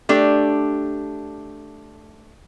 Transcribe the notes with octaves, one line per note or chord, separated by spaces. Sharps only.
A3 D4 G4